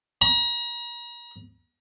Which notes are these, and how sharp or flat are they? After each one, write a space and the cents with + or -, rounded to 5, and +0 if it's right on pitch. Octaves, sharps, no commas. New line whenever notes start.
A#5 +40